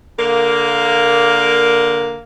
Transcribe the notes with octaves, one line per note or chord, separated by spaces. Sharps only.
D3 A#3